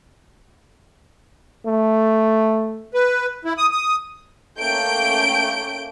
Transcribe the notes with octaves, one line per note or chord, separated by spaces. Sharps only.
A3
B4
E4
D#6
D#6
A3 A#3 C#4 G5 G6 D7